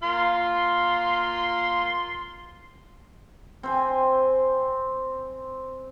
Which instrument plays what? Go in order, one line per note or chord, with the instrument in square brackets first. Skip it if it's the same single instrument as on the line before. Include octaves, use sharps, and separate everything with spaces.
[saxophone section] A#3 F4 [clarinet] C6
[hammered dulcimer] C4 C5 G#5